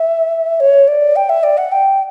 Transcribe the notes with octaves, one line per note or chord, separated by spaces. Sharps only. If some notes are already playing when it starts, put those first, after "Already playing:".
Already playing: E5
C#5
D5
G5
E5
D5
F#5
G5